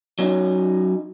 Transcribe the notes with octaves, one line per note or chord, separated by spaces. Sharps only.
F#3 C#4 D#4